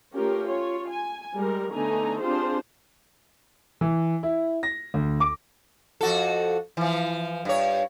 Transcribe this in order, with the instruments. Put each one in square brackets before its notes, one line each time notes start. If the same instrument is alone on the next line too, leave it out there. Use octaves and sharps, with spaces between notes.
[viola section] A3 C#4 F4 G4 A#4
F4 C#5
G#5
G3 G#3 A#4
D3 A3 B3 D#4 G#5 A#5
C4 D4 F4 G4 G#4 C5
[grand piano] E3
E4
A#6
D2
D6
[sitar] F2 F#4 A4
E3 F3
G2 C#5